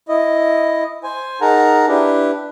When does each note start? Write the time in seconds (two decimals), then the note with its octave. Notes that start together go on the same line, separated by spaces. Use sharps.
0.09 E4 D#5
1.04 C5 G#5
1.41 D#4 G#4 A#4 F#5 A5 A#5
1.88 D4 E4 G4 B4